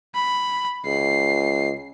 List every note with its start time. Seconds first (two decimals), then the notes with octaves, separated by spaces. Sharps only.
0.15 B5
0.86 C#2 C7